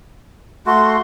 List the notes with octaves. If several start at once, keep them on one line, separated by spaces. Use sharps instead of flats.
A3 F#4 C6